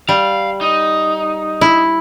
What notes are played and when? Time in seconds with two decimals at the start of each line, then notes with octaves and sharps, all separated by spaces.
0.09 G3 F5
0.61 D#4
1.61 E4